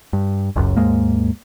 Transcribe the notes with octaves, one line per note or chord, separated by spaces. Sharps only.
G2
F#1 C#2 F#2
D#2 G#2 G#3 A#3